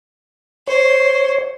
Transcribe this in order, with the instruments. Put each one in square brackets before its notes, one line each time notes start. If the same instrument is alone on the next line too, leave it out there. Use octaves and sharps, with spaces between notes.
[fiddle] C5 [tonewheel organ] C#5